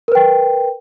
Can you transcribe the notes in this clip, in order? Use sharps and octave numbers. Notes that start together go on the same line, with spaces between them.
A#4 B4 G5